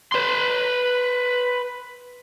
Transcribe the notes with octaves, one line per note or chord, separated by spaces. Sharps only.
B4 C6